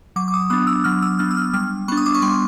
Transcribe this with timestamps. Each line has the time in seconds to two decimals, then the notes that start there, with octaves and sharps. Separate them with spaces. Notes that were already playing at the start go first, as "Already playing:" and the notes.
0.16 F#3 D6
0.28 D6
0.34 D#6
0.50 B3 D4 D#6
0.67 E6
0.84 F#3 F6
1.02 E6
1.19 B3 D4 F6
1.30 E6
1.37 F6
1.53 G3 F6
1.88 B3 D4 C#6
1.97 D#6
2.06 D6
2.14 C#6
2.22 G3 C6